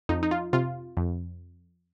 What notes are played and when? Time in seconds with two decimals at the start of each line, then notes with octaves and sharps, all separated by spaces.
0.09 F2 D#4
0.23 D#4
0.31 F4
0.53 C3 F4
0.97 F2